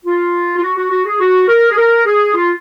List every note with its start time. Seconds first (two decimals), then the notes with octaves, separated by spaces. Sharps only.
0.05 F4
0.57 F4
0.62 F#4
0.77 F#4
0.91 F#4
1.06 G#4
1.20 F#4
1.48 A#4
1.70 G#4
1.77 A#4
2.06 G#4
2.35 F4